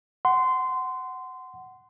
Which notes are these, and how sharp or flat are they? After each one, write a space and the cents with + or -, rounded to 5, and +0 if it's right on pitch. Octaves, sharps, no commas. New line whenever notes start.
F#5 +10 C6 -20